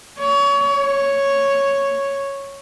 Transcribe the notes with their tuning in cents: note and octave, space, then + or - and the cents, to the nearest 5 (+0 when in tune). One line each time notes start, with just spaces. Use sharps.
C#5 +30
C#5 +0